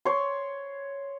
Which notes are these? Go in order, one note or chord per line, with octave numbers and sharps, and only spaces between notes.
C#5 C6